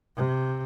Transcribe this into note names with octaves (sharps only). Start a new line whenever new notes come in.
C3